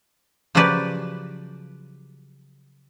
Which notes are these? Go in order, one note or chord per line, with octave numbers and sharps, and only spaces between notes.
C#3 F3 F#3 G4 B4 D5